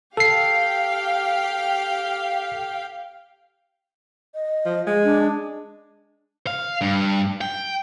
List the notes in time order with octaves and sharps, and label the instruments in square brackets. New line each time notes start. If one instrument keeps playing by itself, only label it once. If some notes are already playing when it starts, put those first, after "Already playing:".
[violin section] G4 F5 G5 [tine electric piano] A4 C7
[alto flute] D#5
[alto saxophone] F3
G#3
[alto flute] D4
[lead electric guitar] F5
G2
G5